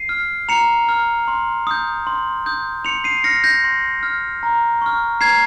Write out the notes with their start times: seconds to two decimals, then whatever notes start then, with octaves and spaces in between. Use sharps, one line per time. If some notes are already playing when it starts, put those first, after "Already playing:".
Already playing: C7 D#7
0.09 F6
0.48 A#5 C#7 F7
0.89 F6
1.28 C6
1.67 D#6 G6
2.07 C6
2.46 D#6 G6
2.85 C6 C#7 F7
3.04 C7 D#7
3.24 F6 A#6 C#7
3.44 G6 A#6
3.64 C6
4.03 F6
4.43 A#5
4.82 C#6 F6
5.21 A#5 G#6 C7